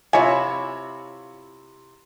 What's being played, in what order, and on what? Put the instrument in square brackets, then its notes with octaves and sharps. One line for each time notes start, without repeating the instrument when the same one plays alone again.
[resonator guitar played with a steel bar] C3 E4 [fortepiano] F4 C#5 [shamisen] G#5